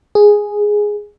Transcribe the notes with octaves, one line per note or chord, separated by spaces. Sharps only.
G#4